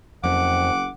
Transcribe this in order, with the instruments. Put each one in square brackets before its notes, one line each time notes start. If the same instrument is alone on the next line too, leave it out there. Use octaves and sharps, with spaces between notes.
[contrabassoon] F#1 [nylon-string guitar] F2 [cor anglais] F#5 [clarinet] D6